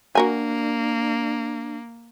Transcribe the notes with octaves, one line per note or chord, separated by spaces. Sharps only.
A#3 D4 F#4 A#4 G#5